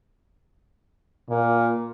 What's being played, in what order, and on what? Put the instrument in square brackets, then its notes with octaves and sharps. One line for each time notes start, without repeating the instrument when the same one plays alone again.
[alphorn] A#2